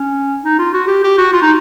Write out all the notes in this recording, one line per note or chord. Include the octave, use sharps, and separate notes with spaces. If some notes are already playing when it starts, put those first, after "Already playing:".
Already playing: C#4
D#4
F4
F#4
G4
G4
F#4
F4
D#4